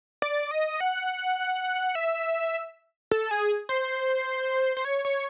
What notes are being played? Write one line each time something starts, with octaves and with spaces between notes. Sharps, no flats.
D5
D#5
F#5
E5
A4
G#4
C5
C5
C#5
C#5